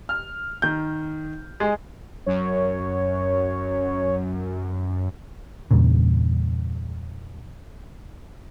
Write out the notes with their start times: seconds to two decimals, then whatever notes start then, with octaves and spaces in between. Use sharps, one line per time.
0.09 F6
0.62 D#3 G6
1.60 G#3 G#4
2.26 F#2 C#5
5.71 E2 G2 A#2 C#3